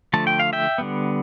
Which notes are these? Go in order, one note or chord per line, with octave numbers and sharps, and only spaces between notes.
D3 F3 A3 A5
G5
F5
E5 G5
D3 G3 B3